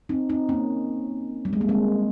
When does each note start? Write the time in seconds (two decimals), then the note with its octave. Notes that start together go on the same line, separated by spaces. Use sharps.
0.09 C4 D#4
0.29 C4 D#4
0.49 A#3 C#4
1.45 G3
1.53 G#3
1.61 A#3
1.68 G#3 C4